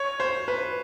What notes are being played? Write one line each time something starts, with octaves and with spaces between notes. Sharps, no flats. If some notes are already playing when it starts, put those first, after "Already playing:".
Already playing: C#5
C5
B4